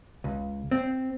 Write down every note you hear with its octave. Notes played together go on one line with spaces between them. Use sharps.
C#2
C4